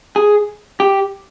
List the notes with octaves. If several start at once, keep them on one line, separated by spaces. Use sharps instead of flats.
G#4
G4